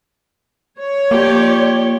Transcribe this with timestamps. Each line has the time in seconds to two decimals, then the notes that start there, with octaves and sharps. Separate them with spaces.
0.77 C#5
1.11 F3 A#3 G4 D5